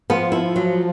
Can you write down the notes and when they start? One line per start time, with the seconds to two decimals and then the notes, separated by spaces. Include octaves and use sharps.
0.10 F3 B3
0.32 E4
0.56 F#3